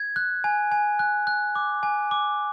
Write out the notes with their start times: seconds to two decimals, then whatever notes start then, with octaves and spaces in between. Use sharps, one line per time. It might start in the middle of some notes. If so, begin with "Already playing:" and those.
Already playing: G#6
0.16 F#6
0.44 G#5
0.72 G#5
0.99 F#6
1.27 F#6
1.55 D6
1.83 G#5
2.11 D6